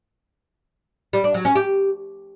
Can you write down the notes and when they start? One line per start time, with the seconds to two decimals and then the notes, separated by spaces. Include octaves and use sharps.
1.13 G3
1.24 D4
1.34 F#3
1.45 C#4
1.55 G4